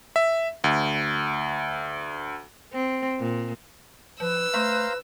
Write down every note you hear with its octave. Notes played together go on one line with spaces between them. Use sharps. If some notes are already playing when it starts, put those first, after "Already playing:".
E5
D2
C4
A#2
F3 B4 E6
A3 C5 F5 A#5